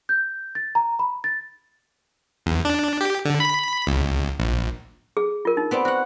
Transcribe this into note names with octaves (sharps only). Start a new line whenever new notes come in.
G6
A6
A#5
B5
A6
E2
D4
G4
D3
B5
C#2
A#1
G#4
F4 A#4
D#4
B3 C4 D5
F#4 F#5